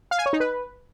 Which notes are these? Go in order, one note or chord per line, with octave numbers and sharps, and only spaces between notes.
F5
G#5
C#5
D#4
B4